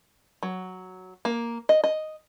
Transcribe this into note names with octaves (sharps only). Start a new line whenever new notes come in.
F#3
A#3
D#5
D#5